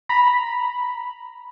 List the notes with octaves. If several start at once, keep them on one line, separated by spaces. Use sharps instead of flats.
A#5 B5